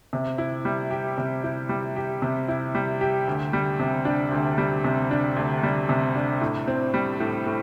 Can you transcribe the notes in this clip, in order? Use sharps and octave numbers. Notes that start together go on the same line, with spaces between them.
C3
E4
G3
G4
C3
E4
G3
G4
C3
E4
G3
G4
D2
G3
C3
D4
D2
G3
C3
D4
D2
G3
C3
D4
A2
C4
G3
A2
A2